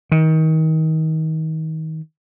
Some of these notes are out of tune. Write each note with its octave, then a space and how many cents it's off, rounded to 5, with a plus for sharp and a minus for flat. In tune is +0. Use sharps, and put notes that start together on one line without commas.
D#3 +30